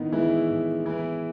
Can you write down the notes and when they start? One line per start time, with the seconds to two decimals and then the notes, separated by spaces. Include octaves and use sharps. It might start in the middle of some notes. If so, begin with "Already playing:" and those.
Already playing: A2 D#3 B3 D#4
0.12 E3 G#3 E4
0.49 A2
0.86 E3 B3 E4